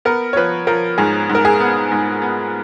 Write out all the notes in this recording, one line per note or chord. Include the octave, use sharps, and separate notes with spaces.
B3 A#4
C#5
F3 B4
F3 A#4
G#2 G#4
G#2
A#4
G#4
B3
G#2
B3